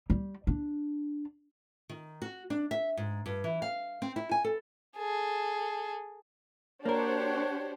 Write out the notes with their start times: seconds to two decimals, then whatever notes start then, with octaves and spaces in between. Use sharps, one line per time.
0.10 G3
0.47 D4
1.89 D#3
2.22 F#4
2.50 D4
2.71 E5
2.97 G#2
3.26 G2
3.44 E3
3.62 F5
4.02 C4
4.16 E4
4.31 G#5
4.44 A4
4.98 G#4 A4
6.85 A#3 D4 F#4 G4 A#4 C5 C#5